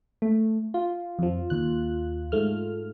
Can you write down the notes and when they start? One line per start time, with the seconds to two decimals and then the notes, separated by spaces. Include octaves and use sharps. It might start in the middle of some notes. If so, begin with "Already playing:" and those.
0.22 A3
0.74 F4
1.19 F2 F3
1.50 D#2 F#6
2.32 G#2 A3 F6